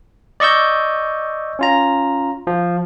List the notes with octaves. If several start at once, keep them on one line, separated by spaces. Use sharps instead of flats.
D5 D#5 C#6 E6 G6
C#4 F4 A#5
F3